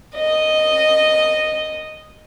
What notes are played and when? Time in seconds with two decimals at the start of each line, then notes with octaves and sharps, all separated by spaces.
0.16 D#5